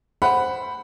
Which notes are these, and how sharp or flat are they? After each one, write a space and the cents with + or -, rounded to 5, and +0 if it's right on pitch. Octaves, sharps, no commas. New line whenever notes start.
C5 +0 F#5 +5 B5 +5